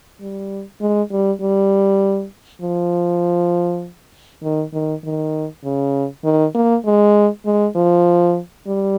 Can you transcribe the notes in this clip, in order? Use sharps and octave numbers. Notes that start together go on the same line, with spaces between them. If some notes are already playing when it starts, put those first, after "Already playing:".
G3
G#3
G3
G3
F3
D#3
D#3
D#3
C#3
D#3
A#3
G#3
G#3
F3
G3